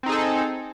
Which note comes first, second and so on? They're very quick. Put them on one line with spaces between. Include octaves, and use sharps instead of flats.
C4 D#4 G#4 A4